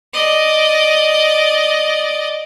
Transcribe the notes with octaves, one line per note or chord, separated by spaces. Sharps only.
D5 D#5